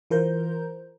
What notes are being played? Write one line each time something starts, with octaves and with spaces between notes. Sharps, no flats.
E3 F4 A#4 C5 A#5 G6